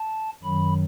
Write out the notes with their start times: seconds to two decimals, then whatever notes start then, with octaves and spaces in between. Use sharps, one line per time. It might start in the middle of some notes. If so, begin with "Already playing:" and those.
Already playing: A5
0.43 F#2 D#3 F#3 B5